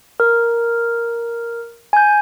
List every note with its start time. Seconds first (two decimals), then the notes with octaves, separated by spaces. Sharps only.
0.20 A#4
1.93 G#5 G6